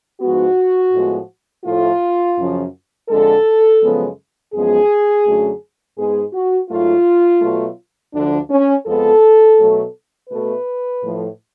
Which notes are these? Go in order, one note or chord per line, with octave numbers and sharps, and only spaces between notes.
G#2 F3 G#3 B3 F#4
A2 F3 G#3 B3
A2 F3 A3 F4
F#2 C#3 F3
F2 D3 G#3 A4
F#2 C#3 F3 G#3 B3
F#2 F3 G#3 B3 G#4
F#2 D3 F#3 A3
G#2 G#3 B3 G#4
F#4
G#2 F#3 A3 F4
B2 F#3 A3
D2 D3 F3 D4
C#4
F2 F3 G#3 B3 A4
B2 F#3 A3
B2 A3 B4
A2 F3 A3